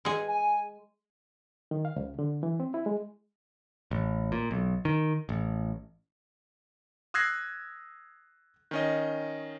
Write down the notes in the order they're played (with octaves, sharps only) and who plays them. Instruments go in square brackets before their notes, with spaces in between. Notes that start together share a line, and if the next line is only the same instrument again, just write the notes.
[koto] G#3 G#4
[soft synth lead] G#5
[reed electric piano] D#3
F5
C#2
D3
E3
C4
E4
G#3
[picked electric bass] A1
A#2
B1
D#3
A1
[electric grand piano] D#6 E6 F#6 G#6 A#6 C7
D#3 C#4 D#5